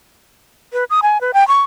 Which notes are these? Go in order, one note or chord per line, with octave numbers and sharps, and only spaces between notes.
B4
D#6
G#5
B4
G5
C#6